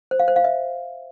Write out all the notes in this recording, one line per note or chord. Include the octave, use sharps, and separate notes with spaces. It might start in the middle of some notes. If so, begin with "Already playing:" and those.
C5
F5
C5
F5
E5